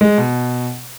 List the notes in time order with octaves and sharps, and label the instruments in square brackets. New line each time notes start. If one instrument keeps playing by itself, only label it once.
[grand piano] G#3
B2